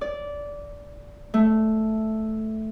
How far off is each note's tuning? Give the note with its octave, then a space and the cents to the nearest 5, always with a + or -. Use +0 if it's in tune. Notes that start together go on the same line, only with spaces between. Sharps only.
D5 -15
A3 -5